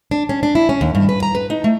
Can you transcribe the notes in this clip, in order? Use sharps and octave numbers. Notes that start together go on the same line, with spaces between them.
D4
C#4
D4
E4
C#4
D#2
G2
B4
A#5
B4
D#4
A3